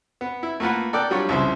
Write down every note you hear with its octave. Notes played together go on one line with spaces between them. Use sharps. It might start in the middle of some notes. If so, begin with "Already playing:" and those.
B3
E4
A3 A#3 F4 B4 F#5
A4 A#4 D5 G5 F#6
F#3 G3 D4 F4 C#5
C2 C#3 F3 E4 C5